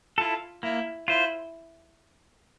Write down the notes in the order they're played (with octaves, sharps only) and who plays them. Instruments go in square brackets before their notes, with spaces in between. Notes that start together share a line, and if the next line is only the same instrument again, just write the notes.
[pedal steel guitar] E4 A4 [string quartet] F4
[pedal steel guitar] A#3 [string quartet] E4
[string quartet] E4 [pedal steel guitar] F4 C5